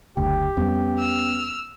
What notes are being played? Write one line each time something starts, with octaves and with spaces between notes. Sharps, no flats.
F#1 D2 G4 G5
F2 G3 B3 C#4
E6 F6